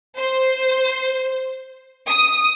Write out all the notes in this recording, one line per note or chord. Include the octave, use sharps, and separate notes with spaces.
C5
D#6